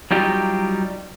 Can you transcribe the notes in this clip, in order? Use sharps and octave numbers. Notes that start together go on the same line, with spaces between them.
F#3 G3 D#4 F4 G4